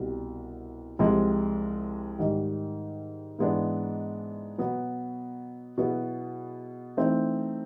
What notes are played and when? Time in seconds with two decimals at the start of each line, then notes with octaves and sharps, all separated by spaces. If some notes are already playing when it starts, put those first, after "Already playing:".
Already playing: C2 B2 G3
0.99 C2 C3 F3 G#3
2.19 G#2 D#3 G3
3.39 G#2 E3 G#3 B3 D4
4.58 B2 F#3 B3
5.78 B2 F#3 B3 E4 G#4
6.97 E3 A3 C4 D#4